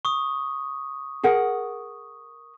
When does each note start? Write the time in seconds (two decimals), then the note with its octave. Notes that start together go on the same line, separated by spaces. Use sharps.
0.05 C#6 D#6
1.23 G#4 A#4 F#5